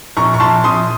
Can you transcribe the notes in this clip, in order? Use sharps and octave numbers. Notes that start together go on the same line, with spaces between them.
A#1 A#5 C#6
C#6
A#1 A5 C6
A#1 C6 D#6